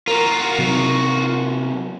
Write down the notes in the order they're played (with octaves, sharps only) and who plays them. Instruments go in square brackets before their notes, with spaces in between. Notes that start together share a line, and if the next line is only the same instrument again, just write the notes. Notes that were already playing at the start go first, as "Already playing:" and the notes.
[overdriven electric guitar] F4 F#4 [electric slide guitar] A#4
[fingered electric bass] C3 F#3